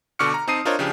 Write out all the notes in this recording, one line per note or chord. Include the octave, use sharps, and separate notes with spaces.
B2 D3 C#6 D6 F6 C#7
A#5
C4 D#4 A5 D#6 C7 D#7
D4 F4 A#4 C5 C#5 D#5
C#3 F3 D4 G4